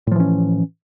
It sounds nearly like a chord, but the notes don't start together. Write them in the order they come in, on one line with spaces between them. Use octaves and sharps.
A2 F3 E3 C#4